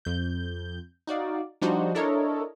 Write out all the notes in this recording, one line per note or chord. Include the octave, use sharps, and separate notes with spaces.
F2 G6
D#4 F#4 D5 F5
F3 G3 D4 D#4 F#4 C5
D4 E4 A4 A#4 C#5 D#5